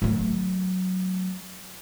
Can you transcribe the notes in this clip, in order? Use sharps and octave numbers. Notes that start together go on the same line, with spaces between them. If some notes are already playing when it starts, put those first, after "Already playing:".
F#3 A3